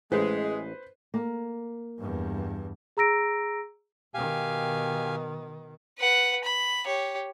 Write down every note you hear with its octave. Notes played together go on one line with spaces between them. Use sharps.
A1 G#3 B4 C5
A#3
E2 G2
G#4 A#5 E6 A#6 D7
B2 D#3 G4 F5 G#5
B4 F#5
B5
G4 C#5